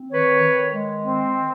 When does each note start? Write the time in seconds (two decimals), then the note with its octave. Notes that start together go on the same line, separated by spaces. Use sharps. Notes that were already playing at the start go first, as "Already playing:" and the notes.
Already playing: C4
0.11 D#3 B4 C#5
0.42 D#3
0.73 G#3
1.04 C4
1.34 D#3